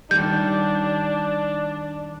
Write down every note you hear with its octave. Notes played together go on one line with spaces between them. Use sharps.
D#3 G3 D4 G6